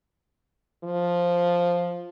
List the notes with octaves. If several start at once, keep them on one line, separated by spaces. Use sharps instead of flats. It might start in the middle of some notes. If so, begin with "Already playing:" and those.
F3